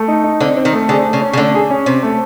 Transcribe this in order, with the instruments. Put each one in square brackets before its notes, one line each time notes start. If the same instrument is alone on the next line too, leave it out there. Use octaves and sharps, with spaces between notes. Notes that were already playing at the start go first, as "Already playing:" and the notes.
Already playing: [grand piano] A3
D#4
D#4
[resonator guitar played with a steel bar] D3 [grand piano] C4
[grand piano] C4
[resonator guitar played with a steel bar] D#3
[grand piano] A3
[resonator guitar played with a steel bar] D3 [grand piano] G#4
[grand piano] A3
[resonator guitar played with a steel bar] C#3
[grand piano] C#4
[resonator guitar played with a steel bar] C#3
[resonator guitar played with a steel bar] D3 [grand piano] A3
[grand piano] G#4
C#4
[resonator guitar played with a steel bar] C3 [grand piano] C4
[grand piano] A3